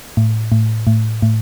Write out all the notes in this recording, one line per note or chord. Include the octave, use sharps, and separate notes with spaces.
A2
A2
A2
A2